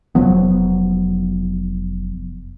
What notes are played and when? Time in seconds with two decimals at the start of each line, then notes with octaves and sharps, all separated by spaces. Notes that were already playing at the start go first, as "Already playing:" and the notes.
0.15 F1 F3 F#3 B3